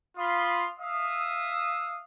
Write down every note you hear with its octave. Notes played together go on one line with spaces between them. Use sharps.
F4 F5 B5 C6 D#6
E5 F5 D#6